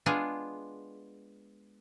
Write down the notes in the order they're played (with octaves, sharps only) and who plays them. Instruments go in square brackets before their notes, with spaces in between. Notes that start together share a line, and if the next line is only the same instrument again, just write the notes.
[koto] G#3 B3 D4 F4 G#4